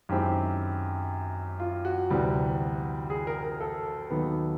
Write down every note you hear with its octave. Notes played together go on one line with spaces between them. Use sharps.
F#2 D#3 G#3 C4 E4 G4
F4
F#4
D2 C3 E3 G3
G#4
A#4
A#4
A4
D#2 D#3 F#3 B3